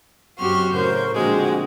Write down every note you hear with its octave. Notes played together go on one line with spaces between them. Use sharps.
F#2 C4 F#4 G4 C6 C#6 F6
A2 C#3 A#4 C5 C#6 G6
A#2 D3 F3 G#3 C4 F#4